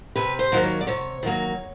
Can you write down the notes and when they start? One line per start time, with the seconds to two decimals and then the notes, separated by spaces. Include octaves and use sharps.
0.16 C3 B4
0.39 C5
0.52 D#3 F#3 A#3
0.64 C#5
0.81 D5
0.87 C3 C#5
1.23 D#3 F#3 A#3